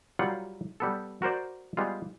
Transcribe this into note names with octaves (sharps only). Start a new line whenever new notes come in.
F#3 G3 F4 A#4 F#5
G3 B3 A4
F#4 A#4 C5 D5
G3 G#3 B3 F4